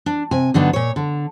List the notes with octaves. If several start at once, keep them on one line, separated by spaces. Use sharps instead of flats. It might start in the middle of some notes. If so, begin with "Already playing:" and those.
D4
C3 G#5
G2 D3 F#3 B3 D4 D#4
A#2 C#5
D3